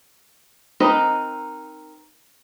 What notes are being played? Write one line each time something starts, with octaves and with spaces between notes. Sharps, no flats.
C4 D#4 A#4 B4 D#5